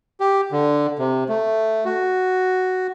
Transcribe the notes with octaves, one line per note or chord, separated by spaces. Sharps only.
G4
D3
C3
A3
F#4